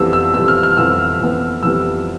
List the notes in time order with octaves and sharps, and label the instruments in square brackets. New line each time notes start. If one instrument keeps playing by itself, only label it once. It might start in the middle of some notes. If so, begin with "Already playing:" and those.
Already playing: [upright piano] F2 E3 G3 B3 E6
E6
F2 E3 G3 B3 E6
F6
F6
F2 E3 B3 E6
F2 E3 B3
F2 E3 G3 B3 E6